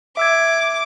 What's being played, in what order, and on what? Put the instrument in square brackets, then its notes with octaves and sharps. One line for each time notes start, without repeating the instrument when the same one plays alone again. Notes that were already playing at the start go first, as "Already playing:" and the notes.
[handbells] E5 E6 G#6 [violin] D6